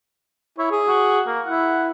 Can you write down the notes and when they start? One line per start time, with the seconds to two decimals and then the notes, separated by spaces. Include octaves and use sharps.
0.58 E4 C#5
0.71 G#4
0.88 F#4
1.27 A#3
1.46 E4 F#5